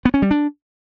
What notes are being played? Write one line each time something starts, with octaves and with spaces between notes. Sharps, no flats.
B3
C#4
G3
D4